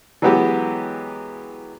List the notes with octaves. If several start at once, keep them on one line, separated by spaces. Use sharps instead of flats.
E3 F#3 G#3 B3 F#4 G4